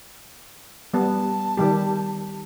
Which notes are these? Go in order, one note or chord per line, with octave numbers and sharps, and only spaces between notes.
G3 B3 A5
D#3 G3 G4